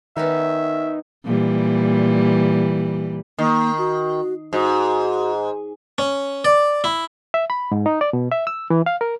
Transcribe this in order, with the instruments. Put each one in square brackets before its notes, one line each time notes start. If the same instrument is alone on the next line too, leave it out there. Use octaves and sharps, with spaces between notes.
[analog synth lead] D#3 [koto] B3 C#4 D#4 [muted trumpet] E5
[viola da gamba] A#2 E3 G3
[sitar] D#3 [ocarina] A#3
[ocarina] F#4
[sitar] G#2 [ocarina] F#4
[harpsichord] C#4
D5
E4
[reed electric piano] E5
B5
G#2
D#4
D5
B2
E5
E6
E3
F5
A#4